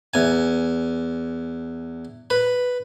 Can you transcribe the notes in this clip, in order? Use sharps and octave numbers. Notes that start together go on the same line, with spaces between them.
E2 G#5
B4